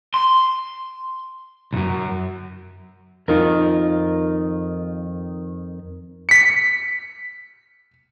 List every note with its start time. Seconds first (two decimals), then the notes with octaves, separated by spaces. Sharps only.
0.14 C6
1.73 C2 F#2
3.28 F2 D#3 D#4 F4 A#4
6.29 B6 C#7